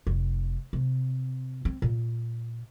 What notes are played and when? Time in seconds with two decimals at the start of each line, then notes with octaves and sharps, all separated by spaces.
0.07 F1
0.73 C3
1.65 C4
1.82 A#2